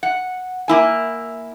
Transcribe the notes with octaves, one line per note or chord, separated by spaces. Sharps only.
F#5
A#3 E4 G#5